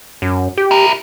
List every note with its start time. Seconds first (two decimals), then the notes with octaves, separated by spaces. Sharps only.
0.22 F#2
0.57 G4
0.71 E4 A#4